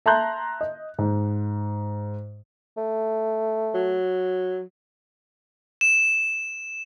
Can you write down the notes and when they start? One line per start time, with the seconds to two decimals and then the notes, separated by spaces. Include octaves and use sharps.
0.06 E5 A5 A#5 C6 F#6 G6
0.61 D#5
0.99 G#2
2.77 A3
3.74 F#3
5.81 E7